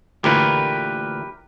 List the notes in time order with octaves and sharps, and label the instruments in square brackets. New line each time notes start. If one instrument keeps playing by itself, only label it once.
[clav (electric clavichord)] D2 A#2 E3 [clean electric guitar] G4 A#4 B4